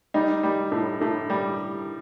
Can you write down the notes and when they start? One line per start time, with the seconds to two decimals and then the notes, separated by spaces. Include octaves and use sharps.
0.14 G3 D#4
0.43 G3
0.72 A2
1.01 A2
1.30 G3